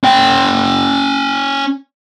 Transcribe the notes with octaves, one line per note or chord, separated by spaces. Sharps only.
C#4 G5